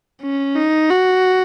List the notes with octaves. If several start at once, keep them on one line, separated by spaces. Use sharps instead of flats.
C#4
D#4
F#4